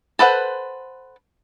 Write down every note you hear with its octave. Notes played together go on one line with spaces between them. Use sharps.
A4 B4 C5 F#5